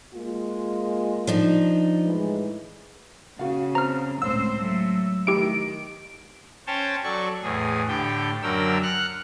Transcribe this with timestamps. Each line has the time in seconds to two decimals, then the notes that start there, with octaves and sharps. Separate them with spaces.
0.13 G#3 A#3 F4
1.27 F3 D4 D#4
2.04 A2 E3 G#3
3.39 C#3 F#4 F5
3.75 C4 A#5 F6
4.22 C#2 A2 C4 C5 E6
4.58 F#3 A3
5.27 D#3 A3 E4 G4 D7
6.67 C#4 C5 C#5 G5 A5
7.04 F#3 A4 D5 C#6
7.43 E2 A2 G#4
7.88 A2 D3 G4 G5
8.42 F#2 D3 F#3 A#4 G5 E6
8.82 F#5 F6 F#6